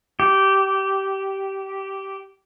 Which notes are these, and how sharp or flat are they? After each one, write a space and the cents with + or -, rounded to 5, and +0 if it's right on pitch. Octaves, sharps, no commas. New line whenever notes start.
G4 -15